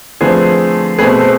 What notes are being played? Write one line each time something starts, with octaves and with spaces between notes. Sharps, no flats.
D3 F3 A3 C4 G#4 B4
B2 A3 C4 G#4 B4
A4 C5